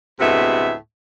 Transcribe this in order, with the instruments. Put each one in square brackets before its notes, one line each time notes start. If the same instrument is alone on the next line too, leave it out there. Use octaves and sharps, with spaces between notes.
[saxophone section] D2 A2 C3 G#3 B3 E5